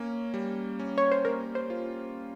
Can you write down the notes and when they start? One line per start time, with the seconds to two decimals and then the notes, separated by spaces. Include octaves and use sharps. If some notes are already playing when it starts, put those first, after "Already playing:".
Already playing: A#3 C#4
0.34 G3
0.79 C#4
0.98 C#5
1.11 C5
1.25 A#3 A#4
1.55 C5
1.70 F4